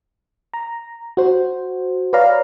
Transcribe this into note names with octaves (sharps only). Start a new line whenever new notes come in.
A#5
F#4 C5
B4 C#5 D5 F5 A#5